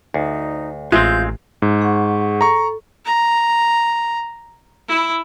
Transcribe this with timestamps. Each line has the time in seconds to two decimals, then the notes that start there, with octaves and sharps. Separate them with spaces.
0.14 D2 D#4
0.92 A1 G#3 C4 F4 E5 G6
1.62 G#2
1.81 G#4 F#5 C#6
2.41 A4 A#5 C#6
3.05 A#5
4.88 E4